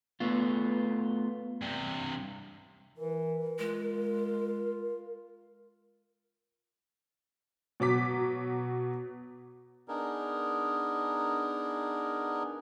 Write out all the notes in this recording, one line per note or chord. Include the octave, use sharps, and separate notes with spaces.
A3 B3 F4
G2 C3
E3 A#4
G#3 F4
B2 F#3 D6 B6
B3 D4 D#4 G#4 A#4